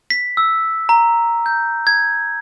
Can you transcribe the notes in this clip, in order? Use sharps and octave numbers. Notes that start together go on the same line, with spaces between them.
B6
E6
A#5
G6
G#6